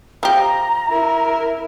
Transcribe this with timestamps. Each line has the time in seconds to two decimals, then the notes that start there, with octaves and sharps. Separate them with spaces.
0.23 F3 G4 A#5
0.88 E4 A#4